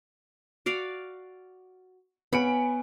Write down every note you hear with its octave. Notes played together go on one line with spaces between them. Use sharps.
F#4 D5 F5
B3 C#5 F5 G#5 B5 C#7 D7